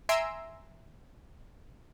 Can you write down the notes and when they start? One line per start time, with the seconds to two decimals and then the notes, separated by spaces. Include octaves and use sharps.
0.09 E5 G#5 A#5 C6 E6 D7